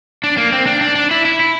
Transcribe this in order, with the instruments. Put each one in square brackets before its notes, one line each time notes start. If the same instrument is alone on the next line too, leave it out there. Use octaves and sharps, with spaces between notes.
[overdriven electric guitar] D4
A#3
C4
D4
D4
D4
E4
E4
E4